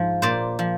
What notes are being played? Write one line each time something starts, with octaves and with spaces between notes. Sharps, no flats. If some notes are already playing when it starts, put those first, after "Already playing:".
Already playing: G#2 F3
A#2 C5 D5
F3